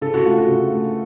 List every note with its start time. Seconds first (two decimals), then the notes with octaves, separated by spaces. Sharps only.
0.01 C#3 A4
0.14 F#4
0.25 A3 F4
0.38 F#4
0.48 C#3
0.72 A3